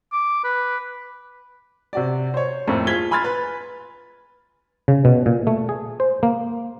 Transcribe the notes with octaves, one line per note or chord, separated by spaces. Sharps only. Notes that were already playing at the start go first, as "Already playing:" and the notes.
D6
B4
C3 F#4 D5
C5 C#5
F2 A2 A3 A#3 C4
F4 G#4 G#6 B6 G7
G#5 B5 C6 F6 G#6 A6
B4
C#3
B2
A#2
A3
G#4
C5
A#3